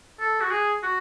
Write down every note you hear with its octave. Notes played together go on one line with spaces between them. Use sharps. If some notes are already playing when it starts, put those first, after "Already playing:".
A4
F#4
G#4
F#4